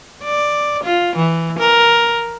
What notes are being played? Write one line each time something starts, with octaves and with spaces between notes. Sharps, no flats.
D5
F4
E3
A#4